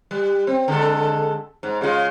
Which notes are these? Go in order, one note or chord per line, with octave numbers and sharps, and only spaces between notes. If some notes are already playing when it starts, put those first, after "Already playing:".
G3
C4
D3 G#3 A4
G#2
C#3 G#3 F4